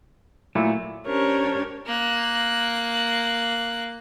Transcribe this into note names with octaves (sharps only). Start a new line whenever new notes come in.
A#2 F#3 A3 E4
C#4 D4 G4 A#4 C5 C#5
A#3 F#6